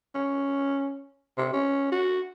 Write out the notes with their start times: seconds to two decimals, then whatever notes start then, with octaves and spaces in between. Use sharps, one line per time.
0.15 C#4
1.38 C3
1.53 C#4
1.92 F#4